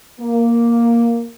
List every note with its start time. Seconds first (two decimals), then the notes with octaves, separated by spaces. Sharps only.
0.20 A#3